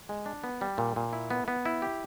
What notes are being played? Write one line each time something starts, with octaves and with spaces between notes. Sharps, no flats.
G#3
D4
B3
G3
A#2
A#2
E4
B3
B3
E4
G4